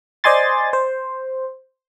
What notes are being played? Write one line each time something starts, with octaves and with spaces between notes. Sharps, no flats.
C5 D5 D#5 G#5 C6 A6
C5